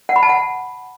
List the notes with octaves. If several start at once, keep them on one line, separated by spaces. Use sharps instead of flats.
F#5
B5
A5
F#5